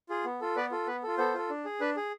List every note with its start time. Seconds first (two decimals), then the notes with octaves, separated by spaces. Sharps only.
0.09 F4 G#4
0.25 B3
0.41 F4 A4
0.56 B3 B4 D5
0.71 F4 A4
0.87 B3 B4
1.03 F4 A4
1.18 B3 A4 C5
1.34 F4 A4
1.50 D4
1.65 G#4
1.80 D4 B4
1.97 G#4